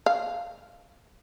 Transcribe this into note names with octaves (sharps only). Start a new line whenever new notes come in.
F5